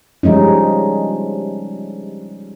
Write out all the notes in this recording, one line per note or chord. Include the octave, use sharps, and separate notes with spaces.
F3 G3 G#3 C#4 D#4